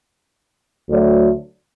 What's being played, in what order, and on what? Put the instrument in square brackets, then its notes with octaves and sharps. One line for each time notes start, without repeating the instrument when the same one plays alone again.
[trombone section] D2 D3 F#3 A3